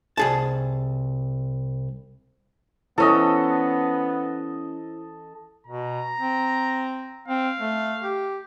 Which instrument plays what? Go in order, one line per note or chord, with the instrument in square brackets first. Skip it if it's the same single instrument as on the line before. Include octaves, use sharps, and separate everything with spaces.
[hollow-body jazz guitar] C2 G#4 A5
[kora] E3 C#4 [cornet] B3 [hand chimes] E4 C5 [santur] A4 D#5
[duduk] B2 [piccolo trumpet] A#5
[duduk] C4
[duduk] C4 [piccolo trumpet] F5
[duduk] A3
G4